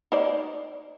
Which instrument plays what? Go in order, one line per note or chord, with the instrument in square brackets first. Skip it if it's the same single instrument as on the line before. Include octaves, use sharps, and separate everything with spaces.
[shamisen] D#4 C5 D5